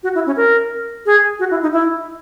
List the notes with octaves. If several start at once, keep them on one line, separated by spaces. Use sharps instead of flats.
F#4
E4
C#4
A#4
G#4
F#4
E4
D#4
E4